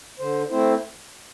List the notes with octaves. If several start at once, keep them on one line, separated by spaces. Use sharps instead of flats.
D3 C5
A3 C4 E4 C5